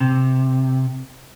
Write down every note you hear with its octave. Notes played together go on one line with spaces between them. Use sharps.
C3